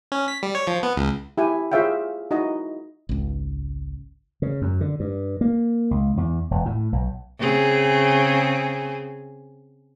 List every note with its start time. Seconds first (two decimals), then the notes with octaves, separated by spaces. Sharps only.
0.12 C#4
0.28 B6
0.43 G3
0.55 C#5
0.67 F3
0.83 B3
0.96 C#2
1.38 E4 G4 G#5
1.72 F4 G#4 C#5 E5 F5 G5
2.31 D#4 E4 F#4 D#5
3.09 G#1 C#2
4.42 C#3
4.62 F#2
4.81 D3
5.00 G2
5.41 A#3
5.91 C#2
6.17 E2
6.51 E1
6.66 A2
6.92 B1
7.39 C#3 C4 G#4